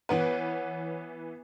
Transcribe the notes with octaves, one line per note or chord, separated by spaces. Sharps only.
E3 B3 B4 C#5 F#5